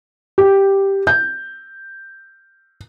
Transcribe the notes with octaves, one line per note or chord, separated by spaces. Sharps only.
G4
G6